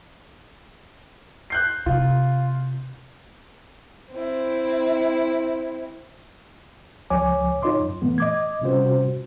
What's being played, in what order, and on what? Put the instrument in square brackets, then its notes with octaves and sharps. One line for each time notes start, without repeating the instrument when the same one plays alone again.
[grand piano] F#6 G6 C7
[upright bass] C3 [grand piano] F4
[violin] C4 E4
[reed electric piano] C#2 F3 C#5 G#5 D6
D#4 F4 C#5 D#5 C6 D6
F#2
A#2 E3 A3 B3
D#5 D6 G#6
C3 G3 C#4 F4 F#4 C5